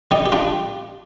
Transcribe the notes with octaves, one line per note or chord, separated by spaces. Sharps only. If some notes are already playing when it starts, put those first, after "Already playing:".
G3 D#4 G4
G4
G3 D4 F4